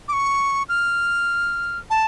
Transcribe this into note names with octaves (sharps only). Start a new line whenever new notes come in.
D6
C#6
F6
A5